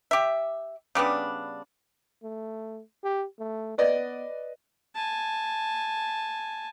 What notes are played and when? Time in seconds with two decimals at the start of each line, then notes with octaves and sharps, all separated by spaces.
0.11 G4 E5
0.95 C#3 G3 B3 D4
2.23 A3
3.04 G4
3.39 A3
3.78 B3 B4 D5 D#5
4.95 G#5 A5